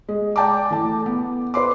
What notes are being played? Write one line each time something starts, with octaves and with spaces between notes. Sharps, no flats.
G#3
D5 G5 A5 A#5 D6
E3 A3 A5
B3
B4 C5 C6 D6